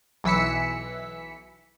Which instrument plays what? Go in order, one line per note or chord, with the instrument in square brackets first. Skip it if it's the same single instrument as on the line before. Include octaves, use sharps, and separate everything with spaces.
[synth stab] B1 E3 E6 B6 C#7